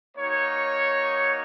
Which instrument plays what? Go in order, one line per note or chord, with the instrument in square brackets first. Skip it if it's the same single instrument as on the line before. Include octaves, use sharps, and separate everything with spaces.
[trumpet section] A#3 D#4 F#4 C#5